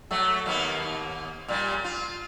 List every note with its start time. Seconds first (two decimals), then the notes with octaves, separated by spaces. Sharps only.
0.11 F#3 A3
0.46 D#2 A#3 B3
1.48 A#2 G3
1.84 F4